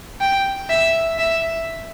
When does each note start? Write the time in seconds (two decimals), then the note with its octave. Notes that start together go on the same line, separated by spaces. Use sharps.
0.21 G5
0.70 E5
1.18 E5